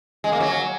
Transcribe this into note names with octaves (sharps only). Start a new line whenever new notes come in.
G#3
A#3
F#3